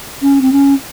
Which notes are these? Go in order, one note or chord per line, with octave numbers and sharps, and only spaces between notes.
C#4
C4
C#4